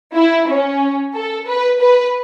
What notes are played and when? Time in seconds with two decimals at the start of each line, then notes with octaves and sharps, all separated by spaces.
0.15 E4
0.48 C#4
1.14 A4
1.47 B4
1.80 B4